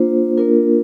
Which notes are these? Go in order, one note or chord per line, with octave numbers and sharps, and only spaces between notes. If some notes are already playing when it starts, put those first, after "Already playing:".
Already playing: A#3 D4 F4 C5
A#3 D4 F4 A#4